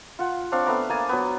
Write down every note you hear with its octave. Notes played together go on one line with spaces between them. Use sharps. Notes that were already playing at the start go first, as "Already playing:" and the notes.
F4 F#5
C4 D4 C#5 F5
A3 B3 A#5 D6
A#3 G#5 A5
F#3 B3